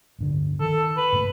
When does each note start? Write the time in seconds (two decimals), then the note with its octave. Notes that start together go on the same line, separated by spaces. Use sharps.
0.19 D1 G2 D3
0.60 D#3 A4
0.97 B4
1.12 G2 C3 A3